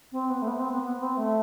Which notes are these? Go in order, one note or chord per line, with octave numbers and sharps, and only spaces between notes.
C4
B3
A3
B3
C4
B3
B3
C4
A3